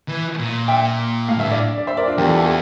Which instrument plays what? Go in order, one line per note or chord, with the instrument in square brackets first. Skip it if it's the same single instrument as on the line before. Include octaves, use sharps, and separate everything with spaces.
[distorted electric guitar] E3
A#2
[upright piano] E5 G5
[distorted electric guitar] A2 [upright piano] F5
[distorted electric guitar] G2 [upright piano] E5
[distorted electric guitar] A2 [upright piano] D5 F5
[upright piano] D5
C5 E5
A#4 D5
D4 F4
[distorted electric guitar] E2 [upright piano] G4 A#4
[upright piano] F4 A4
G4
A4